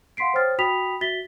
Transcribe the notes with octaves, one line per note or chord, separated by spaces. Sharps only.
F5 F#5 C6 B6 C7 D7
C5 C#5 G5 D#6 F6 A6
F#4 G5 B5 D#6 B6 F7
F#4 E5 A6 B6 G7